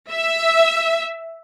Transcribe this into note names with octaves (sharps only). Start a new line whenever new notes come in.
E5